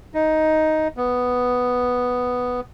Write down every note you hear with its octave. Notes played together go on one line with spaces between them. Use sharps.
D#4
B3